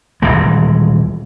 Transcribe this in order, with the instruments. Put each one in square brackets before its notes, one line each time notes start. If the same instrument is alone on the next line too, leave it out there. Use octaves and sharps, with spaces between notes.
[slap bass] D#1 C#2 E3 G#3